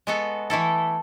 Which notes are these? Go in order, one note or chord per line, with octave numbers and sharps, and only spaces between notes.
G#3 B3 F#4 A4
E3 A3 E4 A4